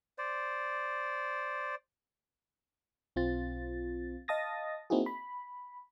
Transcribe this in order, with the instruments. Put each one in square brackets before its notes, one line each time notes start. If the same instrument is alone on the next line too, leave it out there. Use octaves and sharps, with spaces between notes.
[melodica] C5 D5
[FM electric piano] B1 C4 F4 A6
D#5 F5 A5 D#6 A6 A#6
A#3 C4 D#4 E4 F#4 G#4
B5